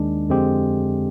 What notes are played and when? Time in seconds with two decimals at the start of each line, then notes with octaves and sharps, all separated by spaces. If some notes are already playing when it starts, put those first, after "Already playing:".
Already playing: D#2 D#3 G#3 D4
0.29 F2 D3 G#3 C4 G4